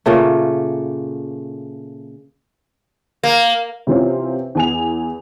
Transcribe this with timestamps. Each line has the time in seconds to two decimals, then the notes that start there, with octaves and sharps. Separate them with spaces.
0.06 A#2 C#3 A3
3.23 A#3
3.87 C3 E3 C4 C#4 F4
4.55 E2 G#5 F7